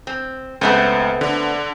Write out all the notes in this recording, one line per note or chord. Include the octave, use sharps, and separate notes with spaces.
C4
C#2 A3 B3 C4
D3